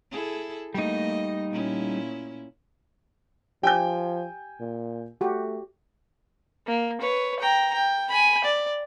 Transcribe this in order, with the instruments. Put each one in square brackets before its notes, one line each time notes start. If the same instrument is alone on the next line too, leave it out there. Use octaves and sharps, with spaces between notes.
[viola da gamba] E4 G#4 A4
[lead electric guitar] G3 D#4 [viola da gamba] A3 A#3 D#5
[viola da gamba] A#2 C#4 E4
[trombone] F3 [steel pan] G4 [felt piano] G5 G#5 G6
[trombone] A#2
[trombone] A3 [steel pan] F#4 G4
[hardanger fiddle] A#3
B4 C#5
G5 A#5
G5
G#5 B5
D5